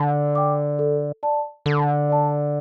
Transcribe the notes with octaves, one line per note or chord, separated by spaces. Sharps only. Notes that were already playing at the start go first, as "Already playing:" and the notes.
Already playing: D3
G5 D6
A4
D5 A5
D3 A4
D5 A5